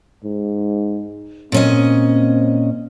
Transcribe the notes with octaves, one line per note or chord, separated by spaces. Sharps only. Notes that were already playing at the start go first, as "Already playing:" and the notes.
G#2
A#2 C4 C#4 D#5